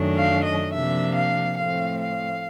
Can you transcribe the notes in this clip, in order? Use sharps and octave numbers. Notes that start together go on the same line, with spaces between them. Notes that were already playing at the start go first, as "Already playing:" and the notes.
Already playing: F#2 D#3 F#3 A3 D4
F5
D#5
C3 F3 A#3 D4 E5
F5
A2 F3 A3 C4 F5
F5